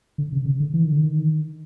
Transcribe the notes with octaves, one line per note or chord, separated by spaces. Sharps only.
D3
C#3
C#3
D3
E3
D#3
D3
D#3